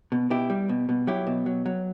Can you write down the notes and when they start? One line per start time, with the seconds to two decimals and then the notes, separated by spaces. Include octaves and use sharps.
0.12 B2
0.30 B2 E4 G4
0.50 G3
0.69 B2
0.89 B2
1.07 F#3 E4 G4
1.27 B2
1.46 F#3
1.66 F#3